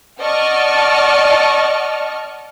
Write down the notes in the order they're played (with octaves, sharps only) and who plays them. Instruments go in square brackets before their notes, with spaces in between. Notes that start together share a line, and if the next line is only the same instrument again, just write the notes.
[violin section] D5 D#5 F#5 A5 C#6 F6